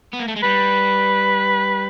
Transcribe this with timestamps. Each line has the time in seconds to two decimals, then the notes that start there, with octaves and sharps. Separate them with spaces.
0.13 B3
0.19 A#3
0.28 A3
0.36 G#3
0.43 G3 B4